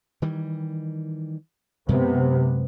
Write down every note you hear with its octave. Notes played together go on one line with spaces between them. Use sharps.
D#3 E3 G3
F#2 C3 G#3 B3